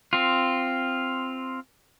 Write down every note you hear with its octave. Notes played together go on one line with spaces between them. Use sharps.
C4 F4